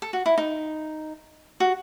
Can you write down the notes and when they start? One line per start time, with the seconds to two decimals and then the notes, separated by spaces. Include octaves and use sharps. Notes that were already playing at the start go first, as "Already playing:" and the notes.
0.02 A4
0.13 F#4
0.26 E4
0.38 D#4
1.60 F#4